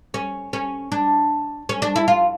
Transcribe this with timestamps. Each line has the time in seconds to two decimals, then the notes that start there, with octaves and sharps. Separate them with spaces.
0.14 C#4
0.53 C#4
0.92 D4
1.69 C#4
1.82 D4
1.96 E4
2.08 F4